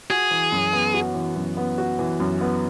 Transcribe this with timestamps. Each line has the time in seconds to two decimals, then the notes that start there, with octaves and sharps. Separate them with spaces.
0.10 F#4 G#4
0.31 E3
0.52 F#2
0.73 B3
0.94 F#4
1.15 E3
1.36 F#2
1.57 B3
1.78 F#4
1.99 E3
2.20 F#2
2.41 B3